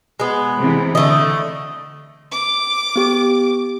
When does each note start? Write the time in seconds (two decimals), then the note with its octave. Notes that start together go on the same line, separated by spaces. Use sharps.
0.20 G#3 B3
0.59 C3 E3
0.95 D3 A3 D#5
2.32 D6
2.96 B3 G4